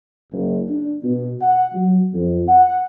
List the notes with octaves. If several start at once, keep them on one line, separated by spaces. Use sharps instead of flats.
F#1
D4
B2
F#5
F#3
F2
F#5